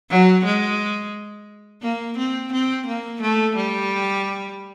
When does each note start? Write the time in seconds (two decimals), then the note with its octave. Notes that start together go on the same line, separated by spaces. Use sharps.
0.10 F#3
0.45 G#3
1.82 A#3
2.18 C4
2.52 C4
2.86 A#3
3.22 A3
3.56 G3